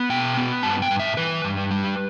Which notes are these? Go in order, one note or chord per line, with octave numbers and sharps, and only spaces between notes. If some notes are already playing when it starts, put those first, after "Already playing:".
Already playing: B3
B2 G5
B3
G2 A5
G5
G2
E5
E3 B4
G2
G3